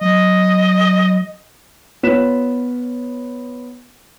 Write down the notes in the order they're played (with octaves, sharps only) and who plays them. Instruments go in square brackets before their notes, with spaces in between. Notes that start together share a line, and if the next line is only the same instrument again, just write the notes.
[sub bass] F#3 [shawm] D#5
[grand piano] B3 F4 C#5 F#6 B6 E7